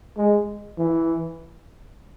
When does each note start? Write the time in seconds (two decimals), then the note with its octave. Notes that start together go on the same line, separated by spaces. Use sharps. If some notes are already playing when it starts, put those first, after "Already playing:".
0.18 G#3
0.78 E3